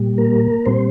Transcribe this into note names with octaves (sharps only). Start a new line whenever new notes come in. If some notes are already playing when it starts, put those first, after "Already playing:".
Already playing: A#2 G3
A#3 A#4
A#2 G3 C4 C5